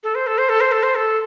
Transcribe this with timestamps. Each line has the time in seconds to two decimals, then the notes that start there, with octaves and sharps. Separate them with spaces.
0.03 A4
0.15 C5
0.27 A4
0.38 C5
0.49 A4
0.61 C5
0.72 A4
0.83 C5
0.95 A4